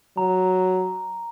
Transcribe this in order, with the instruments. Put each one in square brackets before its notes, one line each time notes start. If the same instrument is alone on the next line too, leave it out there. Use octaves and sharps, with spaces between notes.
[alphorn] F#3 [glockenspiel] A#5